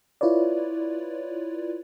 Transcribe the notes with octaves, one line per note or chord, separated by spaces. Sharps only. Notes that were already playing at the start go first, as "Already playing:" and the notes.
E4 F4 B4 C#5 D5